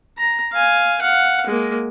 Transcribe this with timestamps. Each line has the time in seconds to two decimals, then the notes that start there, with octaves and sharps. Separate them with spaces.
0.18 A#5
0.53 F5 G#5
1.01 F5 F#5
1.47 G#3 A#3